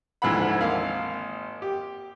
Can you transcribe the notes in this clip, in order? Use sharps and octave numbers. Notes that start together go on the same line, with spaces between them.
D2 G#2 E3 F3 F#5 B5
G#1 A#3 F5
G4